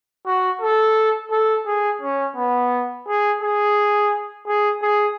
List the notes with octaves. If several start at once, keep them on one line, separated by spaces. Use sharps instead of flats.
F#4
A4
A4
G#4
C#4
B3
G#4
G#4
G#4
G#4